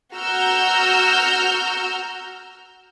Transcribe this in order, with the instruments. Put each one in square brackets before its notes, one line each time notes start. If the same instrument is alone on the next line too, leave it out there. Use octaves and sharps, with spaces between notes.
[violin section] F#4 A#5 E6 F6 G6